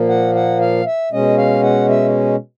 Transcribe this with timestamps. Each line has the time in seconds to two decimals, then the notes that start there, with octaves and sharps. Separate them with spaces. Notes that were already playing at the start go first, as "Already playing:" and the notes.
Already playing: A#2 F3 A#3
0.09 F#5
0.35 F#5
0.61 F5
0.86 E5
1.12 B2 G#3 C#4 D#5
1.38 F5
1.63 F#5
1.89 E5